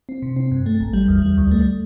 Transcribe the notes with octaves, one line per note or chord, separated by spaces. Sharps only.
C4
C3
C4
G2
A3
A1
G3
E2
G3
D2
A3